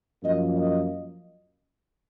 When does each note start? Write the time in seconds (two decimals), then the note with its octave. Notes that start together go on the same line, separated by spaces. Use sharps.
0.23 F#2 F3 A#3 D#5
0.58 D#5